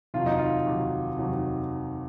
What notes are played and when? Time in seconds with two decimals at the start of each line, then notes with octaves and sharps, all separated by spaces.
0.14 F1 D#2 D#3 F#3 F4
0.26 D#4
0.39 F4
0.66 F1 D#2 D#3 F#3
1.17 F1 D#2 D#3 F#3